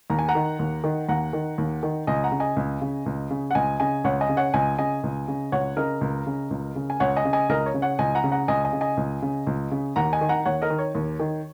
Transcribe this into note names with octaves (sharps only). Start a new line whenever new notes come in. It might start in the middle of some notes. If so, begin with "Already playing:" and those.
D#2 A#5
G#5
F#5 A#5
D#3
D#2
D#3
D#2 F#5 A#5
D#3
D#2
D#3
C#2 D#5 G#5
F#5 A#5
C#3
D#5 G#5
C#2
C#3
C#2
C#3
F#5
C#2 D#5 G#5
C#3 D#5 G#5
C#2 C#5 F#5
D#5 G#5
C#3
C#5 F#5
C#2 D#5 G#5
C#3 D#5 G#5
C#2
C#3
C#2 C#5 F#5
C#3 A#4 D#5
C#2
C#3
C#2
C#3
G#5
C#2 C#5 F#5
D#5 G#5
C#3
D#5 G#5
C#2 A#4 D#5
C#5
C#3
C#5 F#5
C#2 D#5 G#5
F#5 A#5
C#3
F#5 A#5
C#2 D#5 G#5
D#5 G#5
C#3
D#5 G#5
C#2
C#3
C#2
C#3
D#2 F#5 A#5
D#5 G#5
D#3
F#5 A#5
D#2 C#5 F#5
A#4 D#5
D#3
C#5
D#2
D#3